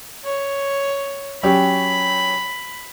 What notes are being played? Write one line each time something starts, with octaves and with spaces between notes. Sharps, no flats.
C#5
F#3 C#4 G4 B5